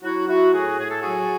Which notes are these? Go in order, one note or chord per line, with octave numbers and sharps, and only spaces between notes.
F#3 E4 F#4
F#3 E4 F#4
A2 F#4 G#4
A2 G#4
A4
F#3 F#4 G#4